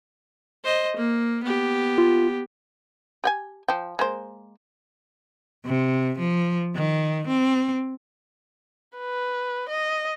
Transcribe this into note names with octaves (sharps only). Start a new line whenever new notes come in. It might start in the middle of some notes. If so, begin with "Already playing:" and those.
C5 D#5
A#3
B3 G4
F4
G4 G5 G#5
F3 G5
G#3 A#3 C5
C3
F3
D#3
C4
B4
D#5